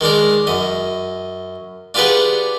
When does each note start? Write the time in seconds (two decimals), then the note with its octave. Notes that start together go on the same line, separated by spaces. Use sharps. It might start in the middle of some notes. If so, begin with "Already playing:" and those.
0.01 D#3 G#3 D4 A#4
0.47 F#2 D#5
1.94 D4 F4 G4 G#4 B4 F#5